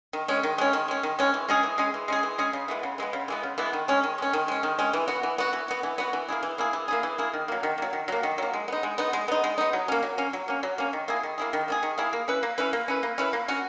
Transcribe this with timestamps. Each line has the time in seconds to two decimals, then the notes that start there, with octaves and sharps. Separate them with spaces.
0.13 D#3
0.28 G#3 C#4
0.43 D#3
0.58 G#3 C#4
0.73 D#3
0.88 G#3 C#4
1.03 D#3
1.19 G#3 C#4
1.34 E3
1.48 G#3 C#4 G#4
1.63 E3
1.78 G#3 C#4 G#4
1.94 E3
2.08 G#3 C#4 G#4
2.23 E3
2.38 G#3 C#4 G#4
2.53 C#3
2.68 E3 G#3 B3
2.83 C#3
2.98 E3 G#3 B3
3.13 C#3
3.28 E3 G#3 B3
3.43 C#3
3.58 E3 G#3 B3
3.73 D#3
3.88 G#3 C#4
4.03 D#3
4.18 G#3 C#4
4.33 D#3
4.48 G#3 C#4
4.63 D#3
4.79 G#3 C#4
4.93 E3
5.08 B3 F#4
5.23 E3
5.38 B3 F#4
5.53 E3
5.68 B3 F#4
5.83 E3
5.98 B3 F#4
6.13 E3
6.28 A#3 E4 G#4
6.43 E3
6.58 A#3 E4 G#4
6.73 E3
6.88 A#3 E4 G#4
7.03 E3
7.18 A#3 E4 G#4
7.33 D#3
7.48 F#3 A#3
7.63 D#3
7.78 F#3 A#3
7.93 D#3
8.08 F#3 A#3
8.23 D#3
8.38 F#3 A#3
8.53 G#3
8.68 B3 D#4
8.83 G#3
8.98 B3 D#4
9.13 G#3
9.28 B3 D#4
9.44 G#3
9.58 B3 D#4
9.73 F#3
9.88 A#3 C#4
10.03 F#3
10.18 A#3 C#4
10.33 F#3
10.48 A#3 C#4
10.63 F#3
10.78 A#3 C#4
10.93 D#3
11.08 A#3 E4 G#4
11.23 D#3
11.38 A#3 E4 G#4
11.53 D#3
11.68 A#3 E4 G#4
11.83 D#3
11.98 A#3 E4 G#4
12.13 A#3
12.28 C#4 E4 B4
12.43 A#3
12.58 C#4 E4 B4
12.73 A#3
12.88 C#4 E4 B4
13.03 A#3
13.18 C#4 E4 B4
13.33 A#3
13.48 C#4 F#4